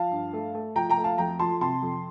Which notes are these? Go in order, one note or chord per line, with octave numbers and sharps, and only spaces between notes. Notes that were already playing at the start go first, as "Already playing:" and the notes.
Already playing: F3 F5 A5
G2
A3
A3
F3 G5 A#5
G5 A#5
A3
F5 A5
F2 G5 A#5
F3 A5 C6
C3 A5 C6
F2